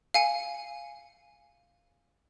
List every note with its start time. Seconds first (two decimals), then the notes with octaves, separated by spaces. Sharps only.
0.14 F5 G#5 C#7